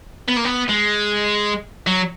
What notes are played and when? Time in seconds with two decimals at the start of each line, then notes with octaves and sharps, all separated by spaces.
0.29 B3
0.37 A#3
0.45 B3
0.69 G#3
1.87 F#3